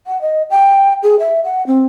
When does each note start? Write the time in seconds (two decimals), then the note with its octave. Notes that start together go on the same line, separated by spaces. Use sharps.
0.07 F#5
0.21 D#5
0.50 G5
1.03 G#4
1.19 E5
1.44 F#5
1.67 C4